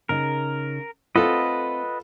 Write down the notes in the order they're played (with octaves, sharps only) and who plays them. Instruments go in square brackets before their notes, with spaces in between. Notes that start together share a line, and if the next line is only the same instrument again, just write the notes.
[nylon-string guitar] C#3 D#4 [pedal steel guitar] A#4
[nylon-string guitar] A3 C4 [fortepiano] F4 A4 [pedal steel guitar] B4 D#5 F#5